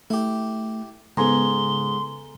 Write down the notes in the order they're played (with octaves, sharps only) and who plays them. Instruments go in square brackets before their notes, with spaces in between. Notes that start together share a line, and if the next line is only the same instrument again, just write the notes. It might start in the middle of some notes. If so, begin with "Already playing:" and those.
[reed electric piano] A3 [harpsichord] E4 G4
[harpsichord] G#2 [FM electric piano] C#3 B3 [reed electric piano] A4 G#5 A#5 [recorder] C6